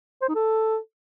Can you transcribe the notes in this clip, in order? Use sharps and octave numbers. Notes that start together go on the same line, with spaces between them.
C5
D#4
A4